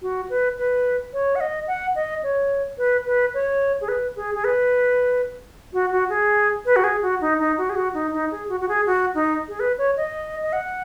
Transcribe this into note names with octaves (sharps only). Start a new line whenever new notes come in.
F#4
B4
B4
C#5
F#5
D#5
F#5
D#5
C#5
B4
B4
C#5
G#4
B4
G#4
G#4
B4
F#4
F#4
G#4
B4
F#4
G#4
F#4
D#4
D#4
F#4
G#4
F#4
D#4
D#4
G#4
F#4
F#4
G#4
F#4
D#4
G#4
B4
C#5
D#5
D#5
F#5